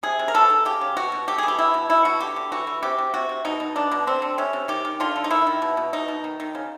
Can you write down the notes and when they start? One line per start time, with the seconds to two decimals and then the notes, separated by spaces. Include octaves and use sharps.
0.03 C3 G#4
0.19 C3
0.28 A#4
0.34 B2 A4
0.50 B2
0.65 C#3 G4
0.81 C#3
0.97 B2 F#4
1.12 B2
1.27 A3 G4
1.38 G#4
1.43 E3
1.48 G4
1.59 B2 E4
1.74 B2
1.89 B2 E4
2.05 B2 F#4
2.20 D3 G4
2.36 D3
2.52 E3 F#4
2.67 E3
2.83 C3 G4
2.98 C3
3.14 C3 F#4
3.29 C3
3.45 B2 D#4
3.60 B2
3.76 B2 D4
3.91 B2
4.07 D3 C4
4.22 D3
4.38 C3 C#4
4.53 C3
4.68 D#3 G4
4.85 D#3
5.00 D3 F4
5.16 D3
5.24 D#4
5.31 D#3 E4
5.47 D#3
5.62 B2
5.77 B2
5.93 B2 D#4
6.08 B2
6.24 D#3
6.40 D#3
6.55 C#3